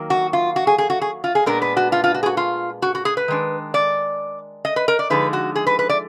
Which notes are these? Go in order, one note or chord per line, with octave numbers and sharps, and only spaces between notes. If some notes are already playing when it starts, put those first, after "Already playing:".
Already playing: D#3 F#3 A#3
F#4
F4
F#4
G#4
G#4
F#4
G#4
F4
G#4
A#2 G#3 B3 D4 A#4
B4
F#4
F4
F4
F#4
G#4
F#4
F4
F#4
F#4
G#4
B4
D#3 G#3 D4
D5
D#5
B4
A#4
D5
D3 F3 G#3 D#4 B4
F#4
G#4
B4
B4
D5